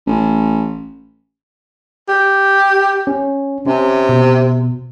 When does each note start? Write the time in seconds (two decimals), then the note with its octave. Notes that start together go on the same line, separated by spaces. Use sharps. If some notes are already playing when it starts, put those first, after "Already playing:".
0.06 A1
2.08 G4
3.07 C#4
3.66 C3 C#4
4.09 B2